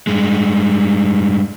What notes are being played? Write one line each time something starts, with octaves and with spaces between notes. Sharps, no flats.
G2 G#3